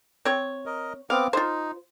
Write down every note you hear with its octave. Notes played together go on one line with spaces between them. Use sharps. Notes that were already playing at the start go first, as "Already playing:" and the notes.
C4 C#5
A#4 D#5
B3 C4 F5 D6
D#4 F4 C5